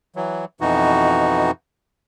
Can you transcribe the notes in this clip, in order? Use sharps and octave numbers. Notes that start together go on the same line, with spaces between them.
E3 F#3
F2 B2 E3 D#4 F#4